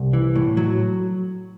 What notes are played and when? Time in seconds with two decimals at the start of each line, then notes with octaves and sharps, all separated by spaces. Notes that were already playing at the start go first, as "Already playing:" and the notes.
Already playing: C2
0.13 E3
0.36 A2
0.57 F#3